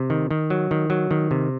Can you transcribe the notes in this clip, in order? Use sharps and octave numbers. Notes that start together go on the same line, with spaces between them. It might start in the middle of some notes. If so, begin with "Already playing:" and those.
Already playing: C3
D#3
D#3
F#3
D#3
F#3
D#3
C3